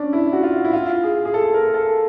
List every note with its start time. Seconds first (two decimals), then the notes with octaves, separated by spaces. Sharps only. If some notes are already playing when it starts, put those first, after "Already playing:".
Already playing: C#4 D4
0.13 E4
0.33 F#4
0.43 F4
0.65 E4
0.73 F4
1.04 G#4
1.25 G#4
1.34 A4
1.54 A#4
1.74 A4